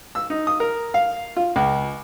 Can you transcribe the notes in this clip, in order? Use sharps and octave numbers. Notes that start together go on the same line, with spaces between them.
E6
D#4
D#6
A#4
F5
F4
C#2